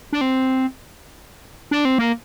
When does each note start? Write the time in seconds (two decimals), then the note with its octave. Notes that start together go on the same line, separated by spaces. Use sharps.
0.13 D4
0.21 C4
1.71 D4
1.85 C4
1.98 A#3